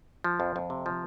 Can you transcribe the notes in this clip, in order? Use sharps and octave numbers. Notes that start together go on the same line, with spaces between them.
F3
F2
F2
C3
F3